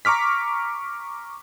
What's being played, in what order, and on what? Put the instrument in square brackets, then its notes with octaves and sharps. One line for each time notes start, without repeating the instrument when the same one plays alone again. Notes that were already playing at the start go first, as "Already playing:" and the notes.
[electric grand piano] A#5 C#6 D6 F6 B6